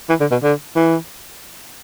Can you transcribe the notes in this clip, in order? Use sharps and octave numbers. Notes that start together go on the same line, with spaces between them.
E3
D3
B2
D3
E3